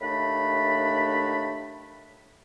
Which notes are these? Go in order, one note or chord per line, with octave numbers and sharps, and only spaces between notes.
D#2 A2 A3 D4 B5